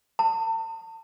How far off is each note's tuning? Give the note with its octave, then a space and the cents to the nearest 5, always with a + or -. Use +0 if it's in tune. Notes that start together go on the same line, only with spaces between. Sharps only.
A5 +35